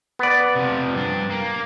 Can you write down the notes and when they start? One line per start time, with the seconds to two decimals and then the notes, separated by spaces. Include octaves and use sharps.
0.19 B3 D5
0.56 C3 F3
0.94 G2 D4
1.31 A#3